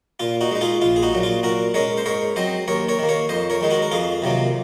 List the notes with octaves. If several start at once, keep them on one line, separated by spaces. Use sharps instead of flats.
A#2 F4
D#4 F#4
G#3 D#4
F4 G#4
A#1 F4
G#4
D#4 F#4
A#2 F#3
F4
A#2 F#4 A#4
G#3 C#4 A#4 C#5
C5
G#2 A#4 C#5
F#3 C4 C5 D#5
D#2 A#4 C#5
A#4 C#5
D#3 A#3
A#4 C#5
F2 C5 D#5
A#4 C#5
D#3 G#3 D#4
F#4 A#4
A#4
F2 F4 G#4
C3 D#3 F#3 A#3